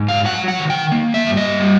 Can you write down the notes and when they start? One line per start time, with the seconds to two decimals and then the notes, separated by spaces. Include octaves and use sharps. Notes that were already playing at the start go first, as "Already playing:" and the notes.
Already playing: G#2
0.08 F5
0.25 F#3 F#5
0.48 F#5
0.59 D#3
0.70 G5
0.92 A#3
1.14 E5
1.26 G2
1.37 D#5
1.60 G3